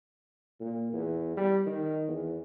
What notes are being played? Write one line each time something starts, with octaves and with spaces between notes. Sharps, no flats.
A#2
E2
G3
D#3
E2